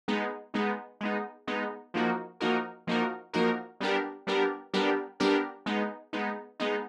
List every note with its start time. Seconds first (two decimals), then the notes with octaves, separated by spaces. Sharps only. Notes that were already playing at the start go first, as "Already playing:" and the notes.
0.08 G#3 B3 D#4
0.54 G#3 B3 D#4
1.01 G#3 B3 D#4
1.47 G#3 B3 D#4
1.94 F3 A#3 D#4 F#4 A#4
2.40 F3 A#3 D#4 F#4 A#4
2.87 F3 A#3 D#4 F#4 A#4
3.33 F3 A#3 D#4 F#4 A#4
3.80 G3 B3 D4 G4 A#4
4.27 G3 B3 D4 G4 A#4
4.74 G3 B3 D4 G4 A#4
5.20 G3 B3 D4 G4 A#4
5.66 G#3 B3 D#4
6.13 G#3 B3 D#4
6.60 G#3 B3 D#4